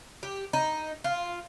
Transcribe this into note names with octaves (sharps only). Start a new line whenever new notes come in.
G4
D#4
F4